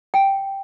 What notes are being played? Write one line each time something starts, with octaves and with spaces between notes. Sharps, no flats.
G5